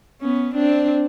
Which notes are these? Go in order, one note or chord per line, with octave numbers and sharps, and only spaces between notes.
B3 C#4
C4 D4